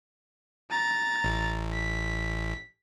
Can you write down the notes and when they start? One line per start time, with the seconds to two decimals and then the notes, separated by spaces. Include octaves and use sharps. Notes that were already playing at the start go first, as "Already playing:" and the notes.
0.71 A#5 A6
1.24 A1
1.73 B6